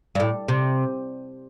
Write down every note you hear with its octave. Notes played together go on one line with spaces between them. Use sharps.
G2
A2
C3